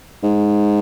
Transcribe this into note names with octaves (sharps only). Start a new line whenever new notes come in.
G#2